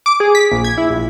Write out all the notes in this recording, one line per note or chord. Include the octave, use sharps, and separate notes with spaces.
D6
G#4
B6
A#1
G#6
E4
A#1